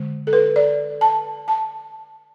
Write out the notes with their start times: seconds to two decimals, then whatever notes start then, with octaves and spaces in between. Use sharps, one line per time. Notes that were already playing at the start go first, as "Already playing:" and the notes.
Already playing: D3 G#3
0.27 A4
0.33 B4
0.56 D5
1.01 A5
1.48 A5